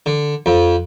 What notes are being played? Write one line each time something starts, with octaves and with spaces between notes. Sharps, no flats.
D3
F2